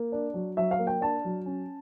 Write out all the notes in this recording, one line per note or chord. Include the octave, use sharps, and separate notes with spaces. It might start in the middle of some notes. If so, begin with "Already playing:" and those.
Already playing: A#3
D4
F#3
F#3 E5
F5
A#3
G5
D4 A5
F#3
C#4